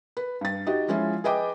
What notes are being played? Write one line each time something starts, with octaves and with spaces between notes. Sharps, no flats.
B4
G2 A6
D#4 F#4 G4 D#5
F3 G#3 C#4 E4 F4
G#4 B4 D#5 G5 D6